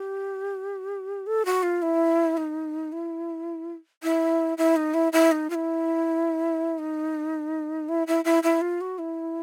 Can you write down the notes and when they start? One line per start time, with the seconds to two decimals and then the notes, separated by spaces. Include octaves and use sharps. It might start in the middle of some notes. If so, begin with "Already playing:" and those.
Already playing: G4
1.27 A4
1.45 F#4
1.63 F4
1.82 E4
2.37 D#4
2.92 E4
4.03 E4
4.58 E4
4.76 D#4
4.94 E4
5.13 E4
5.32 D#4
5.50 F4
5.55 E4
6.79 D#4
7.89 E4
8.07 E4
8.25 E4
8.43 E4
8.61 F4
8.81 F#4
8.98 E4